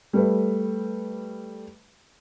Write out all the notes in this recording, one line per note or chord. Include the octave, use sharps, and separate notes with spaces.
G3 A3 B4